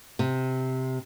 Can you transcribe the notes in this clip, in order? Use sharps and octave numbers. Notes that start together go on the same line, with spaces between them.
C3